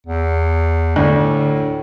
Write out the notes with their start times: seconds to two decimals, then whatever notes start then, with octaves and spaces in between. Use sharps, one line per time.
0.07 E2
0.96 D2 A2